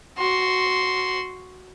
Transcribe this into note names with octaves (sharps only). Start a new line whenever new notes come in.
F#4 C6